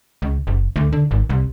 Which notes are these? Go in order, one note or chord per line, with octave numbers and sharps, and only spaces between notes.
C#2
F#1
D2
D3
G#1
C2